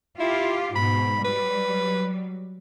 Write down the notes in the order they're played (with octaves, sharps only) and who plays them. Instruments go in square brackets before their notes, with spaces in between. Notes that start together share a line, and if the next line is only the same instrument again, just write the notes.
[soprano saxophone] E4 [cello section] F4 G4
[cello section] G#2 B2 [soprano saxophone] B5
[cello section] F#3 G3 [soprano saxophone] B4